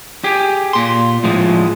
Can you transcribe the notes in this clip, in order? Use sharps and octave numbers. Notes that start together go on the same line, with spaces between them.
G4 G#4
A#2 C6
A2 F3 G#3